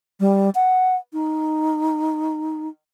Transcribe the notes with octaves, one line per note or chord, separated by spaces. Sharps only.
G3
F#5
D#4